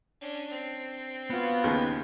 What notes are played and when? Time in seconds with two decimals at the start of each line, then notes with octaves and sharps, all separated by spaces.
0.21 C#4 D4
0.51 C4
1.30 B3 F4 F#4 B4
1.64 D#2 C#3